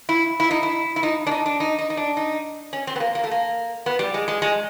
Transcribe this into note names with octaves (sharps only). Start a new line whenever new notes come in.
E4
E4
D#4
E4
E4
D#4
D4
D#4
D4
D#4
D#4
D#4
D4
D#4
C#4
C4
B3
A#3
A#3
A3
A#3
B3
G3
G#3
G#3
G#3